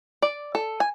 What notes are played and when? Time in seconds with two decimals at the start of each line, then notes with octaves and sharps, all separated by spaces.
0.22 D5
0.55 A4
0.80 G#5